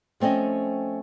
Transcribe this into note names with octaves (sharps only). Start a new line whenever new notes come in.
F3 A3 C4 C#4 D#5